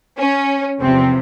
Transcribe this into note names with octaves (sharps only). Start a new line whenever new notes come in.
C#4
E2 C3 F3 C4